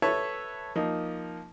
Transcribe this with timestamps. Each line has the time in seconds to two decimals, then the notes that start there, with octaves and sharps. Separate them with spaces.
0.02 A4 B4 C#5 E5 A5
0.75 F3 A#3 D#4